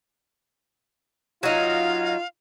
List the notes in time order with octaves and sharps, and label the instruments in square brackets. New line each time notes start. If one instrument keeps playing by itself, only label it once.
[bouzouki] F#3 D#4 [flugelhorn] F4 [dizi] F5